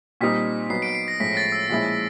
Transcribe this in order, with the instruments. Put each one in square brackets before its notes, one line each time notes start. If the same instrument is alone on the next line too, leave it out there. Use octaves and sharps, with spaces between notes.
[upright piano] A#2 G3 C4 D#4 [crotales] B6
[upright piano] F#3 B3 D#4 [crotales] C7
[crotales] D7
C7
A#6
[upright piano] A2 F3 G#3 C#4 [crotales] B6
[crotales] A6
E6
[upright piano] A#2 F3 G#3 C#4 E4